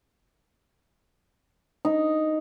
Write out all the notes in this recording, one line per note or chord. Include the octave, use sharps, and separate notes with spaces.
D#4